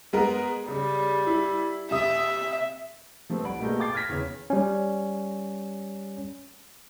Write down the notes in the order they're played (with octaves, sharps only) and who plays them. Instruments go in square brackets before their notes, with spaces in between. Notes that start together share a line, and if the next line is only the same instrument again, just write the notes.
[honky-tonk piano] G#3 B3 A#4
[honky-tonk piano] C#3 [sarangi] G3
[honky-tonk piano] E4
[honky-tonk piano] C3 D#6 [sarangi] E5
[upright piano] F3 A3 C4 G4 B4
C2 D5 F#5 B5 D7
B2 A3 A#3 G4 G#4 G6
F5 G5 D6 A6 C7
F6 G#6 A#6 B6
E2 C#3
[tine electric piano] G3 C#4